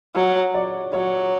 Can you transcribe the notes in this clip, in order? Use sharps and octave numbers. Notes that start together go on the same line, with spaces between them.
F#3 C#5
D5
F#3 C#5